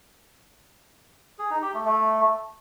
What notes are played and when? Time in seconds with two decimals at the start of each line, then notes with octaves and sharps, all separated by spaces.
1.39 G#4
1.50 D#4
1.62 G4
1.74 A3
1.86 A3